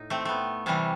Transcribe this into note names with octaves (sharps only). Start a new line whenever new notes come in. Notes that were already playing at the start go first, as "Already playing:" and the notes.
Already playing: A2 D#4
A3 C4
A3 B3
C3 E3 G3 A3